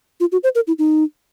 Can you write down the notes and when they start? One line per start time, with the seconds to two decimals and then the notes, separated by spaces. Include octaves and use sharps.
0.20 F4
0.32 F#4
0.43 C5
0.55 A#4
0.67 E4
0.79 D#4